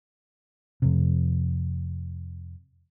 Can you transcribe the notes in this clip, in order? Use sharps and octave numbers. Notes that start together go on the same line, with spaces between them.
F2 C3